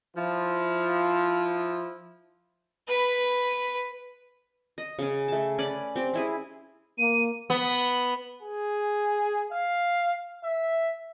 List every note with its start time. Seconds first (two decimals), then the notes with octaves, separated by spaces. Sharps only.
0.16 F3 E4
2.87 B4 B5
4.78 D#5
4.99 C#3 C#4
5.28 A3 A5
5.59 C#4 B4 D5 B5
5.96 C4 G4
6.14 C#4 E4 G#4
6.98 A#3 D#7
7.50 B3
8.43 G#4
9.52 F5
10.44 E5